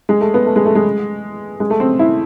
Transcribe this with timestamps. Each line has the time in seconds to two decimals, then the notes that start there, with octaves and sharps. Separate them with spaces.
0.09 G#3
0.21 A3
0.34 B3
0.46 A3
0.56 G#3
0.65 A3
0.75 G#3
1.60 G#3
1.70 A3
1.80 C4
1.99 E4